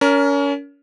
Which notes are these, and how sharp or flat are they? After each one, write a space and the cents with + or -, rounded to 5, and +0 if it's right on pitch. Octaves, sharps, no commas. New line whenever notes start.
C#4 +30 A#4 +0